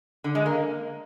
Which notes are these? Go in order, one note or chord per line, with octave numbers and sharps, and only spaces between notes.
D3
G#3
A#3